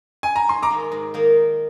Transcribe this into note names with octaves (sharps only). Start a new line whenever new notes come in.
G#5
A#5
G#2 C6
A#5 D6
D#3 A#3 D#4
G#2
D#3 A#3 D#4